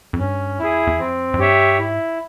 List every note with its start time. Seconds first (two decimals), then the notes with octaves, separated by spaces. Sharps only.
0.13 F2
0.19 G2 C#4
0.59 E2 E4 G#4
0.87 E2
0.99 F2 C4
1.34 F2
1.38 G2 G4 C#5 E5
1.78 G#2 E4